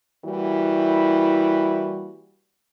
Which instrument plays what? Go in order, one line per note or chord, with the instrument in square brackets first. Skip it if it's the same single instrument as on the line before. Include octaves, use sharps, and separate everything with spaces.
[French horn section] E3 G3 A#3 E4 F#4